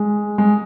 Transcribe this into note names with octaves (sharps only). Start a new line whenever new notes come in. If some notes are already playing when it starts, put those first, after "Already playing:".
Already playing: G#3
G#3